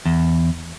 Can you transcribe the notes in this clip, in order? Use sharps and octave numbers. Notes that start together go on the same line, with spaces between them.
E2